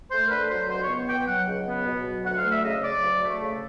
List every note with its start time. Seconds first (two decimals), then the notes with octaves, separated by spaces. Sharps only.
0.11 A3 C5
0.26 A#4
0.30 D3 B4
0.50 F#3 C5
0.69 C#2 C5
0.82 C#5
0.89 B3
1.08 B2 G5
1.28 F#3 F#5
1.47 C#2
1.67 B3
1.86 B2
2.05 F#3
2.25 D2 F#5
2.38 F5
2.44 A3
2.51 E5
2.64 C#3 D#5
2.83 F#3 D5
3.03 D2
3.23 A3
3.42 C#3